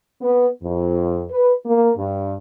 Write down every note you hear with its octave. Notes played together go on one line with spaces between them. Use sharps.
B3
F2
B4
A#3
G2